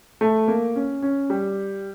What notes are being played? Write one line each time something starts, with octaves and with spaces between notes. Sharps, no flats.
A3
A#3
C#4
C#4
G3